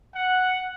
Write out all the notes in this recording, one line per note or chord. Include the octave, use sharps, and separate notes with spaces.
F#5